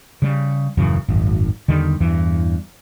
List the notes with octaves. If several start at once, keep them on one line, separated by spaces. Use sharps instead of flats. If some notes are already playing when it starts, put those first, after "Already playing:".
C#3 G3
D#1 F#2 C#3 E3
D#1 G#1 F#2
E2 D3 D#3 G3
E2 G2 E3